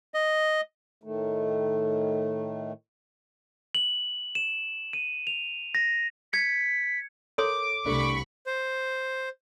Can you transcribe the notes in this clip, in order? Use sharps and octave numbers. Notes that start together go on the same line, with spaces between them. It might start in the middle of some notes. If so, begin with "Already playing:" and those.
D#5
A2 D#3 A3
F#7
E7
D#7
F7
A#6
G#6 B6 C#7
A4 A#4 C#5 C6 D6
C2 A3 D4 B5 C#6
C5